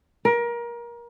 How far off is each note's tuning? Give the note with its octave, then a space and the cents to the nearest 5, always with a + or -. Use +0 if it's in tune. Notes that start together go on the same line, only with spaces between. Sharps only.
A#4 +25